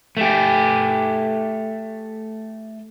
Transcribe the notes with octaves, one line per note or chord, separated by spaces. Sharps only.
A3 G4